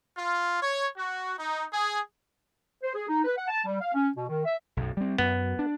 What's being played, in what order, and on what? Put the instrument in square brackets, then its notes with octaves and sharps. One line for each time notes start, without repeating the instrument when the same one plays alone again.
[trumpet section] F4
C#5
F#4
D#4
G#4
[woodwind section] C5
G#4
D#4
B4
F#5
A5
G3
F5
C#4
B2
D#3
E5
[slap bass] B1 F#2
G3 C4
[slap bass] F#2 [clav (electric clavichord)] B3
[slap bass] D4